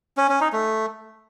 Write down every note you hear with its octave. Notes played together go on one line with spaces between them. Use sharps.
C#4
C#4
D#4
A3